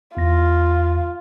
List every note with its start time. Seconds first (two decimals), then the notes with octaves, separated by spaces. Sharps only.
0.17 E2 F4 A#6